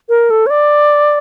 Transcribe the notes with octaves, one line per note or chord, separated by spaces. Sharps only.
A#4
A4
C#5
D5